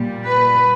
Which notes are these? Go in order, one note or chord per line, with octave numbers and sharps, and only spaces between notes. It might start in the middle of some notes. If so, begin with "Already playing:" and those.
Already playing: A#2 G3
B4